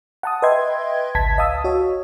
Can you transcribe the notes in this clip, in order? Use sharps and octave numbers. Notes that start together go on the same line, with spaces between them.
F#5 A5 D#6
B4 D#5 E5 G5 C6 G#6
G#1 C#2 A5 G#6 B6
D#5 F5 A5 D#6 E6
F#4 C#5